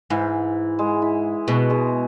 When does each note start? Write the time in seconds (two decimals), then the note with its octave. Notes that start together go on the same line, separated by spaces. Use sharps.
0.10 G#2 E3
0.79 G#3
1.02 E4
1.48 B2 G#3
1.70 G#3